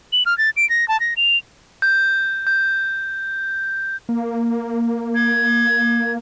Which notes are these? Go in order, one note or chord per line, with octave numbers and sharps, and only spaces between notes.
F#7
F6
A6
D7
A#6
A5
A#6
F7
G6
G6
A#3
G#6